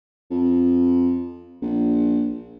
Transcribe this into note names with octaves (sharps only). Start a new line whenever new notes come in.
F2
A#1